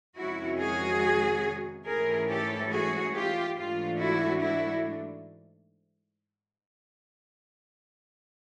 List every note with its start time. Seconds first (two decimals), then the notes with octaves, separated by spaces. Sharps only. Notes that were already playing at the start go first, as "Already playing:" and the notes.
0.16 F2 C3 D#3 G#3 C#4 E4 F#4
0.59 F#4 G#4
1.86 G#2 E3 A3 C#4 E4 G#4 A#4
2.29 G4 A4
2.71 F#4 G#4
3.14 F4 G4
3.56 G#2 E3 A3 D4 F4
3.99 E4 F#4
4.41 E4 F#4